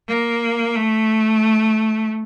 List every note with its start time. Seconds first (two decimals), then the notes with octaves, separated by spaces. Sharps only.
0.08 A#3
0.76 A3